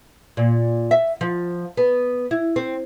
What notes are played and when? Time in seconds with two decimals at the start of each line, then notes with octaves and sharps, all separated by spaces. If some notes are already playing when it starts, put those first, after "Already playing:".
0.37 A#2
0.91 E5
1.21 F3
1.77 B3
2.31 E4
2.56 C4